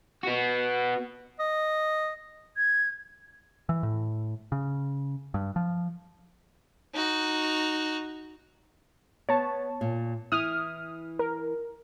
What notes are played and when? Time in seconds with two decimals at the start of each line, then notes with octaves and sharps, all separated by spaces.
0.23 B3 F#4
1.40 D#5
2.57 G#6
3.69 E3
3.83 A2
4.52 C#3
5.34 G2
5.56 F3
6.94 D#4 F#4
9.29 B3 C#5 A5
9.81 A#2
10.32 E3 E4 D#6 F6
11.19 A#4